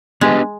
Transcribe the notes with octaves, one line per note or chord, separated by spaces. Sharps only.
G#3 B3 D4 G4 B4 D#5